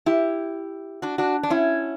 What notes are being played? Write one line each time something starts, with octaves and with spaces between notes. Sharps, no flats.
E4 G4
D4 F#4
D4 F#4
D4
C#4 E4